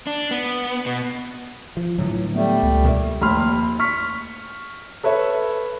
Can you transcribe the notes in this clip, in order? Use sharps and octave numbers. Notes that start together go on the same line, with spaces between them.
D4
B3
B2
F3
A2 D3 E3 F#3
G3 A3 B3
C#2
D#2 B2 A#3
F1 D#2 B5 C6 F6
C#6 F6 B6
A4 B4 C#5 E5